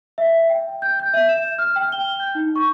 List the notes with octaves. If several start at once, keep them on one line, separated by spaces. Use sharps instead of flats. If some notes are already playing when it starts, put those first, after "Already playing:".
E5
G5
G6
G6
E5
E7
F6
G5
G7
G6
D#4
C#6